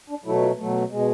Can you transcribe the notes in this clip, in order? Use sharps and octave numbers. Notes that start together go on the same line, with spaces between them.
D4
B2 F#3 A3 E4
F4
B2 F#3 A3
B2 G#3